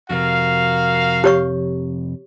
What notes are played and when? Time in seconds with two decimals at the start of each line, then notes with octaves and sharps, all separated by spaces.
0.10 F2 C3 F#4 A#4 F5
1.24 G4 C#5 C#6